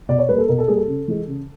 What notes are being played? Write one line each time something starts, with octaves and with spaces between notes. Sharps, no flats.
B2 D5
C#5
G3 A#3 B4
A4
B2 A#4
A4
G3 A#3 G#4
A4
C#3
E3 G#3
C#3